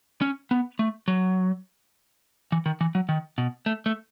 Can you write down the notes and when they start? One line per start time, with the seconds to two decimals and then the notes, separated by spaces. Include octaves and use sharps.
0.21 C#4
0.51 B3
0.79 A3
1.08 F#3
2.52 E3
2.66 D#3
2.81 E3
2.95 F#3
3.09 D#3
3.38 B2
3.66 A3
3.86 A3